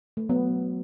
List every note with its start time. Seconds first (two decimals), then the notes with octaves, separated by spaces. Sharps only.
0.17 A3
0.29 F#3 B3